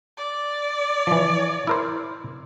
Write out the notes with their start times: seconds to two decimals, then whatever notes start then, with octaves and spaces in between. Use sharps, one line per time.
0.17 D5
1.07 E3 F3
1.67 E4 A#4 C5